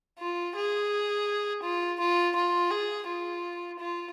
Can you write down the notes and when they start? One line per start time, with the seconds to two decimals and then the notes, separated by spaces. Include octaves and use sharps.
0.19 F4
0.56 G#4
1.63 F4
2.00 F4
2.35 F4
2.71 G#4
3.07 F4
3.79 F4